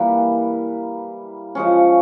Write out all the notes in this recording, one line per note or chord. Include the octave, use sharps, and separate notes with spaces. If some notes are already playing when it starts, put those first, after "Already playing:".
Already playing: E3 G3 A#3
C#3 F3 G#3 C#4